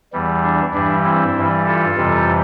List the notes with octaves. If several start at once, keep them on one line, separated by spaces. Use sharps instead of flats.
E2 E3 G3
D4
G2 E3 G3 D4
C4 E4
G2 E3 G3
F4 A4
F2 C3 E3 G3